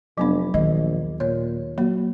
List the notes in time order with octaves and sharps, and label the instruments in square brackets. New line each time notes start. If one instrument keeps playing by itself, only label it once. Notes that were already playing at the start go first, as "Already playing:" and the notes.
[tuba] F1 [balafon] F#3 B3 D4
[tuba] A#1 [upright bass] D#2 D#3 [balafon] D#5
[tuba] A#2 [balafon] C#5
[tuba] F#3 [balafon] A#3